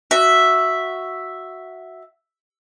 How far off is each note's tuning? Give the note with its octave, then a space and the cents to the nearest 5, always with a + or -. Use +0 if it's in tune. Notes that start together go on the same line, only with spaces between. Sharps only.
F#4 +0 E5 +0